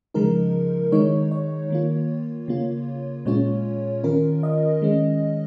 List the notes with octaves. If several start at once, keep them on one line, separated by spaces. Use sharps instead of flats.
C#3 F3 G#3 D#4 A#4
D#3 G#3 D#4 C#5
C#5
D#3 A#3 F4
C#3 A#3 F4
A#2 G#3 C#4 F4 C#5
D#3 C#4 F4 A#4
D#5
D#3 G#3 C#4